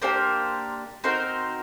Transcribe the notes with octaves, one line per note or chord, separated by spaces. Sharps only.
A#3 D4 G4 A#4 C5
C4 D#4 F#4 A#4 C5